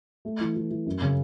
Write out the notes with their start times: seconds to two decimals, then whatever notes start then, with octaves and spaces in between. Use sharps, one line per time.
0.25 A3
0.41 E3
0.56 E3
0.71 E3
0.86 F#2
1.02 C#3